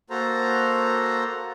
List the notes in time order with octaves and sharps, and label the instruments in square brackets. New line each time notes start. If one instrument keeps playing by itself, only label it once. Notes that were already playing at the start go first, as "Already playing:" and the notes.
[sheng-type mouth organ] A#3 F#4 A4 C5 A#5